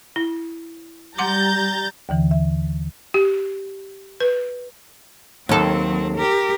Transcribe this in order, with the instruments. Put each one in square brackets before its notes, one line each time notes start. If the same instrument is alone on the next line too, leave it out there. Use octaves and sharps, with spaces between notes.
[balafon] E4
[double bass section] G3 [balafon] F#5 C6 D6 [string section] A#5 G6 A6
[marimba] D#2 D3 E3
E5
[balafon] G4
B4
[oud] D#2 A4 [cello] F#3 C4
[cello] G4 A#4